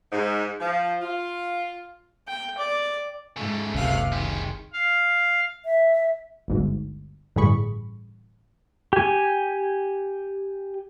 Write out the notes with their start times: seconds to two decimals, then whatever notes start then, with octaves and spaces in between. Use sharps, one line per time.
0.11 G#2
0.60 F3
1.00 F4
2.28 G5
2.58 D5
3.36 G#2 C#3 A3
3.75 F#1 C#2 C3 F5 F#6
4.12 D#3 G#3 G4
4.73 F5
5.65 E5
6.48 G1 D2 G#2
7.36 A1 G2 D3 G#4 B5 C#6
8.93 G4 G#5